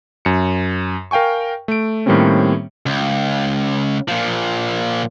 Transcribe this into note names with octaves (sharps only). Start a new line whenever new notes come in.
F#2 C#7
A#4 F5 G5 G#5 C#6
A3 D7
A2 D#3 G3 A#3 C4 C#4
C#2
A#2 F3